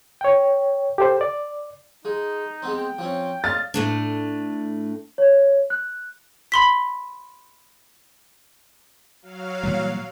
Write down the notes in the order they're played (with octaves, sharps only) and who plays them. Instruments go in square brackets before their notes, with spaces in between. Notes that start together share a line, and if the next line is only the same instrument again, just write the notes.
[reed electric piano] C#5 G5
G4 A4 C5
D5
[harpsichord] G#3 [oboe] D#4
[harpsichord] G#3 B3 C4
[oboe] G5
[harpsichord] F3 C4 C#4
[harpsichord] D#5 C6 [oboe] F5 [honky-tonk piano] A6
[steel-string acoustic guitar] A2 A3 D4
[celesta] C#5
F#6
[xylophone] B5 C6 B6
[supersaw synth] F#3 F5
[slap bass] A#2 E3 G3